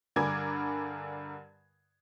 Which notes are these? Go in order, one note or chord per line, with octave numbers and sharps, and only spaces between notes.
G2 D3 A#4 G#5 D6 G#6